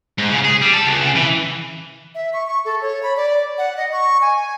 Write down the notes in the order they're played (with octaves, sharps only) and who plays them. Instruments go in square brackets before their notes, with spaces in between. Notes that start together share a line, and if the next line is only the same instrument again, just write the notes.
[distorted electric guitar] G#2
C#3
G#4
G3
A4
C#2
C#3
E3
[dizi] E5
C#6
C#6
A4
C#5
B5
D5
F#5
D#5
C#6
G#5